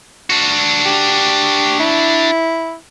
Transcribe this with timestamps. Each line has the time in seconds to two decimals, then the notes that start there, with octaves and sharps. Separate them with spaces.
0.30 D4 F#4
0.86 G4
1.80 E4